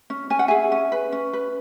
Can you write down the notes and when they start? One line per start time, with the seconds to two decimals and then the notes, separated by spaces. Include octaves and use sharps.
0.10 C#4
0.30 C#4 G#5
0.39 F#5
0.48 G#4 E5 G#5
0.72 C#4
0.92 B4
1.12 C#4
1.33 B4